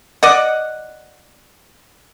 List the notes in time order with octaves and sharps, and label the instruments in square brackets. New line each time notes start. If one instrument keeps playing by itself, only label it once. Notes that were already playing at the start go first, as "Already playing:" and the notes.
[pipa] D5 D#5 F#5